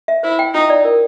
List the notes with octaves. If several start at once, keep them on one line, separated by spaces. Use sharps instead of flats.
E5
E4 C5
G5
D#4 F4
D5
A#4